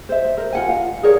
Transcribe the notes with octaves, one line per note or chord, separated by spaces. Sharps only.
C5 E5
A#4
F4 F#5 G#5
F5
G#4 A#4 C#5 D5